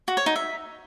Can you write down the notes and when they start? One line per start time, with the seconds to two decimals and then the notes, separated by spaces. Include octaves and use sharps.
0.08 F#4
0.17 C#5
0.26 D#4
0.36 E5